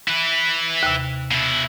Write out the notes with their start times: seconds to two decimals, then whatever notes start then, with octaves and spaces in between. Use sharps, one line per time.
0.08 E4 B4
0.83 D#2 C3
1.31 B2 E4